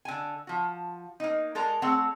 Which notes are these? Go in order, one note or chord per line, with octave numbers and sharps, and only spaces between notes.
D3 G#5
F3 F#4
A#3 D#4
G#3 A4 A#4 D5 A#5
A3 C4 G#4 C#5 F#5